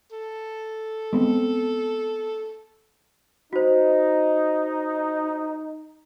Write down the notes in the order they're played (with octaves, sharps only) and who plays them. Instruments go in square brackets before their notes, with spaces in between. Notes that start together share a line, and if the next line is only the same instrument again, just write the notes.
[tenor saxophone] A4
[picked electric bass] G#3 B3 C4
[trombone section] D#4 [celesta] F#4 C5